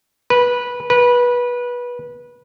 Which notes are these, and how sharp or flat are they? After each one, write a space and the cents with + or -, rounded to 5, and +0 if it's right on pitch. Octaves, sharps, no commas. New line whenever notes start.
B4 -15
B4 -20